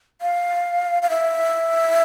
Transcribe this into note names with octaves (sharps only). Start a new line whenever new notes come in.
F5
F5
E5